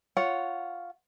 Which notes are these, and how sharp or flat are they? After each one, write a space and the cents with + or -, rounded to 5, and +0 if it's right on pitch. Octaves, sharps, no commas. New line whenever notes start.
F4 +0 C#5 +0 F#5 +0